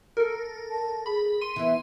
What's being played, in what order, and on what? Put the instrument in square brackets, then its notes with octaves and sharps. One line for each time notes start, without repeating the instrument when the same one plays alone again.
[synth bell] A4 A#4
[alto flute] A5
[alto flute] G#4 [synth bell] B5
[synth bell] C6 D#7
[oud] E3 E4 [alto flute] B3